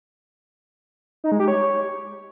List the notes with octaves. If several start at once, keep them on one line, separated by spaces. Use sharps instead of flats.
D#4
G#3
G4
C#5